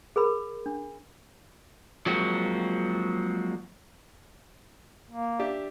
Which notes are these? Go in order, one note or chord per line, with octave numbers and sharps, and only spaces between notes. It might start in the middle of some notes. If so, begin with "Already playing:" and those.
G#4 A#4 B5
D4
F3 F#3 G#3 A#3 C4 F#4
A#3
D4 G4 E5